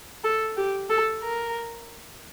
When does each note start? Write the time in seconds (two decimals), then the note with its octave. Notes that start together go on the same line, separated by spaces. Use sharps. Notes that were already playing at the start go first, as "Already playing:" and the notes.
0.24 A4
0.57 G4
0.90 A4
1.23 A#4